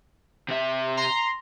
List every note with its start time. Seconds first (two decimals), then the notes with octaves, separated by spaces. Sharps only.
0.48 C3 E5
0.97 A#5 C6